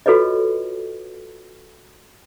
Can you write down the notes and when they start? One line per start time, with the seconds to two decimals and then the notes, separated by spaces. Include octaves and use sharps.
0.06 F4 F#4 A4 B4 C#5 D#5